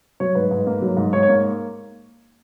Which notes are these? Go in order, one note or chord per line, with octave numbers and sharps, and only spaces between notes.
F#3 C#5
G#2 B4
G#2
A#3
F#3
G#2
G#2 C#5
C#5
A#3